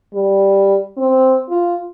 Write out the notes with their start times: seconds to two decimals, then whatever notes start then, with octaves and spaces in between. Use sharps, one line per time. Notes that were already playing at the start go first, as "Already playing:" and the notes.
0.14 G3
0.97 C4
1.49 F4